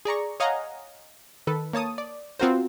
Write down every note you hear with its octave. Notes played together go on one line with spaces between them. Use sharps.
G#4 D5 A#5 C#6
C#5 D#5 F5 F#5 G#5 A#5
D#3 A4 B4
A#3 C#5 A5 D#6
D5
B3 C4 F4 F#4 A#4 C5